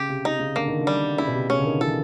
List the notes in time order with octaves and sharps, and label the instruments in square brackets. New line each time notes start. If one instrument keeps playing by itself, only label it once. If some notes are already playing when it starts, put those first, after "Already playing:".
Already playing: [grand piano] C#3 [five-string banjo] G4
[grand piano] C3
[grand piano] C3 [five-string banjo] D#4
[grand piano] C#3
[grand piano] D3 [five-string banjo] A#3
[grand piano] D#3
D3
[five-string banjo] G3
[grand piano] C#3 [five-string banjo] E4
[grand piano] B2
C3
[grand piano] C#3 [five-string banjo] C#4
[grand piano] D3
D#3
[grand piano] E3 [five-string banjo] A4